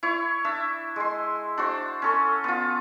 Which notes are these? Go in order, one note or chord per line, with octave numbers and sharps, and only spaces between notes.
E4 C#5
D4 E5
G#3 C6
D4 F#4 C5
C#4 A4 C6
B3 F4